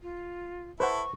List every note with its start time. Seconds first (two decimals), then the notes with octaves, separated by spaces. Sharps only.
0.02 F4
0.80 E4 A4 B4 C5 F#5 C#6